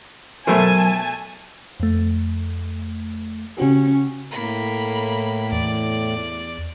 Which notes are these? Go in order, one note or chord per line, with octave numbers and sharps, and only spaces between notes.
B2 F#3 A3 A#4 C5 G#5 A5
F2 A3
C#3 C#4 F#4 G4
A2 A#3 B5
E2 D5